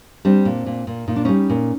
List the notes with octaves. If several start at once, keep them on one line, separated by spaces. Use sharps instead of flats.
G3 C4 D4
A#2
A#2
A#2
A#2 D#4
D4
G3 C#4 D#4
A#2